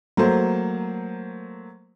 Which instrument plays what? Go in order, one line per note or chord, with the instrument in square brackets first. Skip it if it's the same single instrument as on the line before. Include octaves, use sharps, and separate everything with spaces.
[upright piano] F#3 A3 A#3 C5